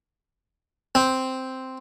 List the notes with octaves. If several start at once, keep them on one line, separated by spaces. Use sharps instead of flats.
C4